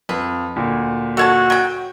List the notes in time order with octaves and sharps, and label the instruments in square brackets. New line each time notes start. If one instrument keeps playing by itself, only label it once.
[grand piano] F2 [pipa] B4
[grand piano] D2 A#2
[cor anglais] F#4 [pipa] A4 C#5 A5
[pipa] F#3 G5